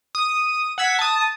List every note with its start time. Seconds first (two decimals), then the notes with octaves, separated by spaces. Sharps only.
0.15 D#6
0.78 F#5 E6 G#6 B6
0.99 A5 D#6